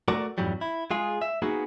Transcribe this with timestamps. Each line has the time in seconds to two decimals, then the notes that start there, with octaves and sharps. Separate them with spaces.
0.08 A3 F#4 A#4 D5
0.38 F2 G#2 E3 F#3 G3
0.61 E4
0.91 G#3 F4 G#4
1.22 E5
1.42 A#3 B3 D#4 F#4 G#4